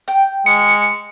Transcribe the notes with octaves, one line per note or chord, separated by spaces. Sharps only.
G5
G#3 C#7